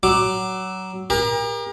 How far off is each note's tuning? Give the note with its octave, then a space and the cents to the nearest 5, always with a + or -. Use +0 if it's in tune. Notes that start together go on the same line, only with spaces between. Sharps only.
F#3 +20 D6 +10
G4 +45 A#4 +25